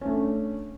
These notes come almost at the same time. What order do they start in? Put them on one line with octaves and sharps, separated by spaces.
C#4 A3 D4